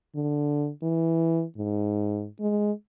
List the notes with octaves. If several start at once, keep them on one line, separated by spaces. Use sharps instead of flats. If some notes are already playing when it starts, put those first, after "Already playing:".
D3
E3
G#2
G#3